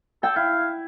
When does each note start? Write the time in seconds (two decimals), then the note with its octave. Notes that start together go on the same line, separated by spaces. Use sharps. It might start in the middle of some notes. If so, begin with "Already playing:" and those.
0.23 A4 G5
0.36 E4 F5